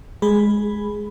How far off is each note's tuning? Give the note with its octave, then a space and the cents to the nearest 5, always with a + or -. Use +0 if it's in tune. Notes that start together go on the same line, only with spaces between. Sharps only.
G#3 +0 G#4 +0 B5 +0